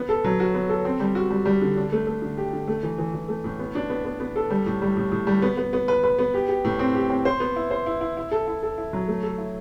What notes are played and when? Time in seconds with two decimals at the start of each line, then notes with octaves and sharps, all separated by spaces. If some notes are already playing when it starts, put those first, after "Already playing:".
Already playing: B3
0.09 A4
0.24 F#3
0.40 F#4
0.54 B3
0.69 A4
0.85 C4
1.00 G3
1.15 F#4
1.30 G3
1.45 G3
1.61 D3
1.77 D4
1.92 A3
2.07 A3
2.22 D3
2.37 G4
2.53 D3
2.68 A3
2.83 E3
2.98 E3
3.14 E3
3.28 A3
3.44 A2
3.59 B3
3.75 D4
3.90 B3
4.05 B3
4.20 B3
4.36 A4
4.50 G3
4.66 A2
4.82 G3
4.97 A2
5.12 A2
5.27 G3
5.42 B3
5.57 B3
5.73 B3
5.88 B4
6.04 B4
6.19 B3
6.34 G4
6.48 G4
6.65 A2
6.79 C4
6.95 G4
7.10 C4
7.25 C5
7.40 B3
7.56 E4
7.71 C5
7.86 E4
8.01 E4
8.17 E4
8.31 A4
8.47 E4
8.63 A4
8.78 E4
8.93 F#3
9.08 A3
9.23 A4
9.38 E4